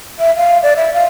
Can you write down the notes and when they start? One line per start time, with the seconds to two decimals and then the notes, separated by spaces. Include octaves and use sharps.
0.19 E5
0.36 F5
0.63 D5
0.76 E5
0.94 F5